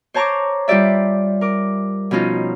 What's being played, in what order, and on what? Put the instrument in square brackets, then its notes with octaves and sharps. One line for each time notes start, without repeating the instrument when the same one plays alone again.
[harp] C5 C#5 A5 A#5 C#6 D6
G3 F4 G4 D5 E5
A#4 D6
B2 F3 C#4 D#4 F4